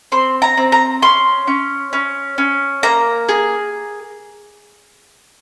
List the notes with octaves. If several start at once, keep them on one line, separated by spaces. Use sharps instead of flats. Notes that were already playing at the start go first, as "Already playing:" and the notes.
C4 C6
A#5
C4
A#5
C#4 C6
C#4
C#4
C#4
A#3 A#5
G#4